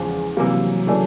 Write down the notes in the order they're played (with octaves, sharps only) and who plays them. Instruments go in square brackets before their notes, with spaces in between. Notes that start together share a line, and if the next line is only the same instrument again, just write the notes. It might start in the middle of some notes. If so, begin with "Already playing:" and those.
Already playing: [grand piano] E2 C#3 F3 G#3
[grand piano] C3 E3 G3 A#3 [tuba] F#3
[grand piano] C#3 E3 A3 D4